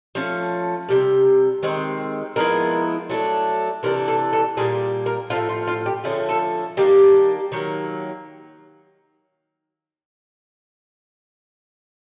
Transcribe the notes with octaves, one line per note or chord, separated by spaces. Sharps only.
F3 A3 C#4
C3 D#3 G3
D#3 G#3 C4
F3 G#3 B3 E4 A#4
F#3 A3 D4
C3 E3 A3 D4 A#4
A4
A4
A#2 G3 A#3 G#4
A#4
A2 F3 A3 F4
F4
F4
G4
D3 F3 A3 C#4 G#4
A4
D#3 G3 A#3 D4 G4
D#3 F#3 A#3